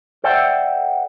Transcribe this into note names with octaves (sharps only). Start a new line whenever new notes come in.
A4 C5 D5 E5 F#5 G5